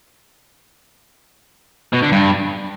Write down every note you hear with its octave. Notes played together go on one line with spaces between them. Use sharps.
B2
D3
G2